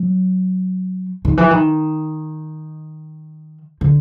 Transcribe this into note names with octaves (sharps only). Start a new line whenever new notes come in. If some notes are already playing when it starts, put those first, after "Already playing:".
Already playing: F#3
D#3
E3
D#3
D3